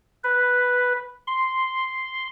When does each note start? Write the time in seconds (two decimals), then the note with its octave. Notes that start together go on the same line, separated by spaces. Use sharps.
0.24 B4
1.27 C6